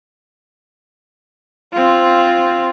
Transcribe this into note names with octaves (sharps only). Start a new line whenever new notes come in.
C4 F4